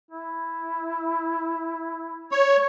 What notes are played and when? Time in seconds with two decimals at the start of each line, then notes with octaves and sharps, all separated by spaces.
0.11 E4
2.32 C#5